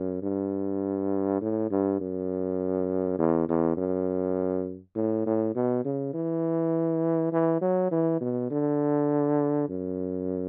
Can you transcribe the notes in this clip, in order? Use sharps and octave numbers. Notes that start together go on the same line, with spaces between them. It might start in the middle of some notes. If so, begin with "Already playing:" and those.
Already playing: F#2
G2
A2
G2
F#2
E2
E2
F#2
A2
A2
B2
C#3
E3
E3
F#3
E3
B2
D3
F#2